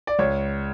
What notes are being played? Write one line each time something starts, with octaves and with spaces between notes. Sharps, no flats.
D5
C#2 C#5